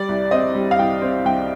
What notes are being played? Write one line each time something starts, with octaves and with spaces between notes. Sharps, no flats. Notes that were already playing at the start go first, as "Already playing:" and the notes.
Already playing: G3 D5
C2
C4 D#5
G3
F5
C2 G5
C4
C2 G5